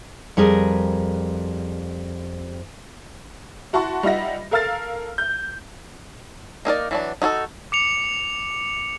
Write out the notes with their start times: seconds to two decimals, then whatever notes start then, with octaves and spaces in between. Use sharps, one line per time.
0.37 F2 G3 G#4 A#4
3.73 E4 F#4 A5 C6 C#6
4.03 G3 D#4 F4 E5 F#5 A#6
4.51 A4 A#4 F5 E6 F6 A6
5.18 G6
6.65 A#3 D#4 A#4 D5
6.91 E3 F#3 D4
7.22 D#4 F#4 G#4 A4
7.72 D6 C#7 F7